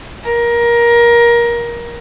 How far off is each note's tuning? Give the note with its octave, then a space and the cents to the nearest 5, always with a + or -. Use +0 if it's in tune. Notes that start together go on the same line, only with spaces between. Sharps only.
A#4 +20